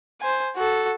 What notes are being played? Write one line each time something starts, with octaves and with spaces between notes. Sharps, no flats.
C5 G#5
F#4 A4